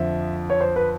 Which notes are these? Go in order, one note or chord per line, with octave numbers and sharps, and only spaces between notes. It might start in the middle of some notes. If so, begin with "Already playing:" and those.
Already playing: F2 D3 F3 E5
C#5
C5
B4